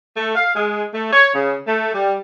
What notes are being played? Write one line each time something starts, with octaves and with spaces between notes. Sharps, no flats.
A3
F5
G#3
A3
C#5
C#3
A3
G3